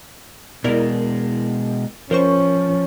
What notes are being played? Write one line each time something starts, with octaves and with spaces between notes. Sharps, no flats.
B2 G#3 E4 A#4 D5
F3 C#4 A#4 C5 C#6